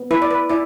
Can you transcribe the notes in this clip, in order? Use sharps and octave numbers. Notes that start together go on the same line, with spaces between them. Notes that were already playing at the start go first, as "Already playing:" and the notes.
Already playing: B3
E4 B4
D5
B4
E4 D5